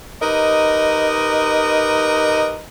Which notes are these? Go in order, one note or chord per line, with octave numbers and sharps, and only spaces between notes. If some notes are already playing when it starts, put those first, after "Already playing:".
D#4 G4 A#4 B4 D#5